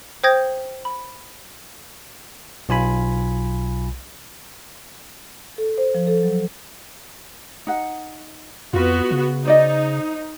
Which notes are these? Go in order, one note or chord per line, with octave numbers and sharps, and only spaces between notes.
C5 G5 D#6 G6 G#6 A#6
B5
B1 F4 G#5 B5
A4
C5
F3
A4
F#3
D#4 F#5
F2 B3 F4 F#4 B4
C#3
D#4 C5 D5 D#5